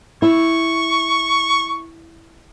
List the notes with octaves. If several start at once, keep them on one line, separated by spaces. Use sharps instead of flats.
E4 C#6